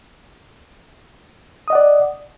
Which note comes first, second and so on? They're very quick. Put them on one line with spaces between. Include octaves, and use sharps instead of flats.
D#6 D#5 F#5 D5